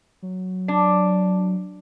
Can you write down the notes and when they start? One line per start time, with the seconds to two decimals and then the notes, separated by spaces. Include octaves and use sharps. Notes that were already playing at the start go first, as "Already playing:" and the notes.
0.22 F#3
0.68 D4